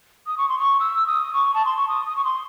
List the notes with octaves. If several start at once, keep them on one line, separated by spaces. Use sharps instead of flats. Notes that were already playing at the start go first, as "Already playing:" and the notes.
D#6
C#6
C6
C#6
E6
D#6
C#6
A5
C6
C#6
D#6
D#6
C#6
C6